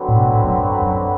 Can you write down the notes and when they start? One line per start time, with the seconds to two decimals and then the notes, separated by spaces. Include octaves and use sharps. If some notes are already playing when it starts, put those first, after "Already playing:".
Already playing: D3 F#3 C4 F#4 B4
0.08 A2
0.15 B2
0.30 A2
0.45 F#2
0.82 F#2